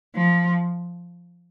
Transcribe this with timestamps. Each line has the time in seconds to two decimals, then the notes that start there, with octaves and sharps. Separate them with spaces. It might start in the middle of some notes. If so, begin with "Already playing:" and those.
0.15 F3